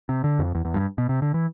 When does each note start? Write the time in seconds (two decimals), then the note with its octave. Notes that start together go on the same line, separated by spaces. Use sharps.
0.09 C3
0.24 D3
0.39 F2
0.55 E2
0.65 E2
0.74 G2
0.98 B2
1.09 C3
1.22 D3
1.34 E3